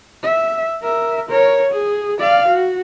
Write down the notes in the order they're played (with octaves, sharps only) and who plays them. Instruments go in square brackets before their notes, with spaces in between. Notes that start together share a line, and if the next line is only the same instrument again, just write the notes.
[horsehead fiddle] E5
A#4 E5
A#4 C#5
G#4
D5 F5
F#4